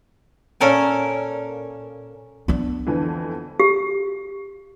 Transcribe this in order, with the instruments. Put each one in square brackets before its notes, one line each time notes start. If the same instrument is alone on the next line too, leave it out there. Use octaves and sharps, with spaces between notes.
[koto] A#2 C#4 A4 A#4 G#5
[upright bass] B3 D4
[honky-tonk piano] F2 D3 E3
[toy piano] G4